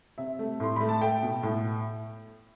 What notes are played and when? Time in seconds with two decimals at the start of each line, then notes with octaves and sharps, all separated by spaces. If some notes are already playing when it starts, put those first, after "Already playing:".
0.18 C3 E5
0.39 A3
0.60 A2 C6
0.76 A3 B5
0.89 A5
1.02 A3 G5
1.23 B2
1.43 A2